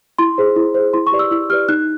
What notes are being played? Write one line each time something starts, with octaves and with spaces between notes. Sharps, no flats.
E4 C6
G#4 C5
E4
G#4 C5
E4 C6
C#6
G4 B4 D5
E6
E4 E6
G4 B4 D5 F6
D#4 F#6